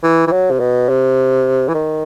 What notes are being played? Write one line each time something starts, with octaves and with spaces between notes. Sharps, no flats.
E3
E3
F#3
C3
B2
C3
E3
D#3